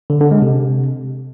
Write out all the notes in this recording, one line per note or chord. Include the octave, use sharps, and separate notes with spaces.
D3
D3
G#3
C3